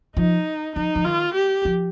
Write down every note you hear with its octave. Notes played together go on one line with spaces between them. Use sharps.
F3 D#4
F3 D#4
F3
D#3 F4
G4
F3